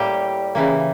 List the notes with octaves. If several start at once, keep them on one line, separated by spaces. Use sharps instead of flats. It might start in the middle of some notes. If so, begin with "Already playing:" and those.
Already playing: A2 G3 A#3 G4
C#3 E3 A#3